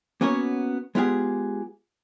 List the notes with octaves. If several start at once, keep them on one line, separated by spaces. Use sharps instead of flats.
A#3 B3 C#4 F#4 C#5
G#3 B3 F4 G4 G#4